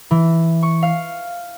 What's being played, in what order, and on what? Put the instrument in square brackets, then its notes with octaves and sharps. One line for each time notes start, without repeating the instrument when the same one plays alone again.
[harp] E3
C#6
F5